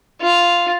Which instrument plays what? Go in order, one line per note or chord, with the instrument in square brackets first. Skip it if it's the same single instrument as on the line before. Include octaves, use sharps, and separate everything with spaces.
[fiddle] F4